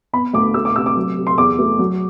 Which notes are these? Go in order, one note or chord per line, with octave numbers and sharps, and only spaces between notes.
B3 B5
D2 D6
A3 E6
D6
C3 E6
D6
F#3
C3
C6
E2 D6
A3
F#3